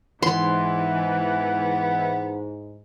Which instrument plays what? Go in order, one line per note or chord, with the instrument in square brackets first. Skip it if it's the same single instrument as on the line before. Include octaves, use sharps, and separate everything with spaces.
[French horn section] G#2 [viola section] E3 [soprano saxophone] B3 [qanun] C6